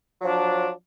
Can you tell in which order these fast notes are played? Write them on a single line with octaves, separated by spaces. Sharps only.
F#3 F3 D4